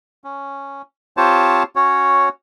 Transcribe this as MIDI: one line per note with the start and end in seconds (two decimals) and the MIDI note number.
0.24 0.82 61
1.17 1.63 60
1.17 1.63 65
1.17 1.63 67
1.17 1.63 72
1.17 1.63 73
1.17 1.63 81
1.76 2.29 61
1.76 2.29 66
1.76 2.29 73